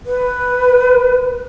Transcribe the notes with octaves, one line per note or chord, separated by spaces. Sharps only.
B4